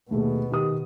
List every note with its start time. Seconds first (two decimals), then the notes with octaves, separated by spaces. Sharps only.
0.11 D#2 B2 A3 G#4
0.51 D#3 G4 D#6